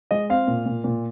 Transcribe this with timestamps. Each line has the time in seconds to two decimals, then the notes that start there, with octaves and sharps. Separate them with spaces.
0.11 G#3 D#5
0.30 C4 F5
0.48 A#2
0.66 A#2
0.84 A#2